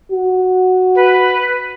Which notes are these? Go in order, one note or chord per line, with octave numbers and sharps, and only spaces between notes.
F#4
B4